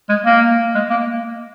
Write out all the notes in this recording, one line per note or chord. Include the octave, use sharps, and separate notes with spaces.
G#3
A#3
G#3
A#3